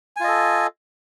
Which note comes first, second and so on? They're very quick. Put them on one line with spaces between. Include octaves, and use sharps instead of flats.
G#5 F4 D#5 A4